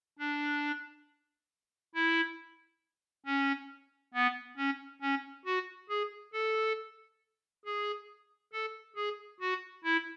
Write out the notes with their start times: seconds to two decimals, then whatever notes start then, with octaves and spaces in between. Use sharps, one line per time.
0.19 D4
1.95 E4
3.26 C#4
4.14 B3
4.57 C#4
5.02 C#4
5.45 F#4
5.89 G#4
6.33 A4
7.65 G#4
8.53 A4
8.96 G#4
9.40 F#4
9.84 E4